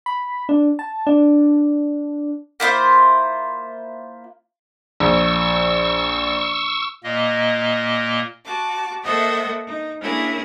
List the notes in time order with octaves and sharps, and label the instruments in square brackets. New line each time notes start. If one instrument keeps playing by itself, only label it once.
[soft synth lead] B5
D4
A5
D4
[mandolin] A#3 E4 F4 C5
[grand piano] A#1 [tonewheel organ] C#6 E6
[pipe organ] A#2 A#3 D#5
[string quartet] F#4 A5 D6
A#3 A4 C5 D#5 E5 F#5
D#4
A#3 C#4 D4 E4 G#4 A#4